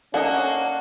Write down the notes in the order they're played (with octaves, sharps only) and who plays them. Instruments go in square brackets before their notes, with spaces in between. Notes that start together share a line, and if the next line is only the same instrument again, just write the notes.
[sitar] A#3 [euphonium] C#4 [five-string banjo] D4 A4 D#5 [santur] F#5